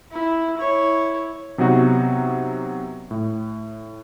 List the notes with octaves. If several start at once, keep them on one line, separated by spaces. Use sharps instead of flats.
E4
E4 C#5
C3 F#3 B3 D#4 F#4
A2